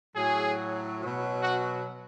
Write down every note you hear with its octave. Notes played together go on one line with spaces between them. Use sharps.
A2 F#3 G#4
B2 F#3
F#4